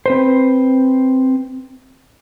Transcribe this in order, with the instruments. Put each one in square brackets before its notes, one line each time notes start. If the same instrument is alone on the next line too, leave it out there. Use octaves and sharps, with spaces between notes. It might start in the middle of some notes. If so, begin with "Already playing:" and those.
[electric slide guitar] C4 B4 C5